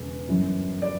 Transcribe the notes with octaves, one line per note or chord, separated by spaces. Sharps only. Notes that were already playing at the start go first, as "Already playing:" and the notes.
Already playing: E1 E2 C#3
G1 F#2 E3
D5